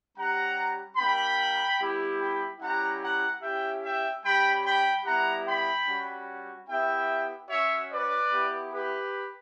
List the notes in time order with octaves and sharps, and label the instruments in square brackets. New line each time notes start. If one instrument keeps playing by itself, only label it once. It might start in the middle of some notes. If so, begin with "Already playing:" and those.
[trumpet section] G3 C#4 G4 F#5 A#5
G3 A#3 D4 G5 B5
G3 B3 E4 G4
G5 B5
G3 C#4 E4 G4 F#5 A#5
F#5 A#5
C#4 E4 G4 E5 G5
E5 G5
G3 C#4 G4 G5 B5
G5 B5
G3 B3 E4 G4 F#5 A#5
G5 B5
G3 C#4 F#4
B3 E4 G4 E5 G5
C#4 F#4 C#5 E5
B4 D5
B3 E4 G4
G4 B4